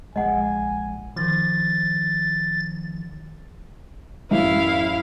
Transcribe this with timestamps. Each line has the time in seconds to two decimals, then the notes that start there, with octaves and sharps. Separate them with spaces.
0.16 A#1 G#3 D#5 F#5 G#5
1.16 D#3 F3 A6
4.31 A1 F#2 E4 E5 F5